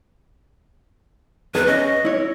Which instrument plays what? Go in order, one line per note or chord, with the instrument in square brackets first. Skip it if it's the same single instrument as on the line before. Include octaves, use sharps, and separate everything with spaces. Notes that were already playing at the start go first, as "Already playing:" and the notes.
[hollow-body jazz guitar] E2 G#4 [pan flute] B4
[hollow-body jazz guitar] C#4 [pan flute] D#5
[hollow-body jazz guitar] E4 C#5